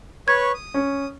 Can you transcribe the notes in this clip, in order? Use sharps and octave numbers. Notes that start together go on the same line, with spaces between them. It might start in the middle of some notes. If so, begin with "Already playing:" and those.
B4 C#5 C#6 G#6
D#6
C#4